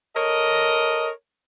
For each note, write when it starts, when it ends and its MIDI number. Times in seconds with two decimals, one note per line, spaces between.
0.15 1.11 69
0.15 1.11 70
0.15 1.11 73
0.15 1.11 75